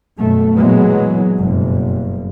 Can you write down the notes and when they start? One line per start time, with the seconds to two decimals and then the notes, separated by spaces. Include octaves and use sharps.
0.17 F#2 B2 A3
0.55 A#2 E3 F#3 G#3 B3
1.36 F#1 G2 B2